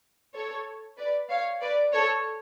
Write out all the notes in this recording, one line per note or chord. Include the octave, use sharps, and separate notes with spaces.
A4 C#5
B4 D5
C#5 F5
B4 D5
A4 C#5